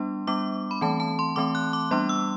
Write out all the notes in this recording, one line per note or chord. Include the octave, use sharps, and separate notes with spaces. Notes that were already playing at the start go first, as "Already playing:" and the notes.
Already playing: G3 B3 D4 C6
G3 B3 D4 D6
B5
E3 A3 C4 A5
A5
C6
E3 A3 C4 D6
F#6
D6
G3 B3 D4 C6
E6